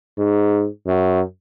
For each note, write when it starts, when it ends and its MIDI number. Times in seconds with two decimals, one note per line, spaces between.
0.18 0.66 44
0.87 1.21 42